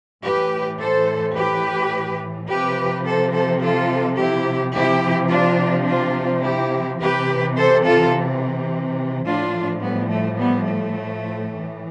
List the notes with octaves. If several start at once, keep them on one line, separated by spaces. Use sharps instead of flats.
A2 E3 G4 B4
A4 C5
G4 B4
C3 F3 G4 B4
A4 C5
A4 C5
F4 A4
E4 G4
C3 F3 E4 G4
D4 F4
D4 F4
E4 G4
C3 E3 G4 B4
A4 C5
F4 A4
A2 F3 D4 F4
G3 B3
A3
G3 B3
A3
A2 E3